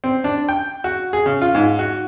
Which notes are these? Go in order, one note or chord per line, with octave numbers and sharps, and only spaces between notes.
C4
D4
G5
F#4
G#4
C#3
F4
G#2
F#4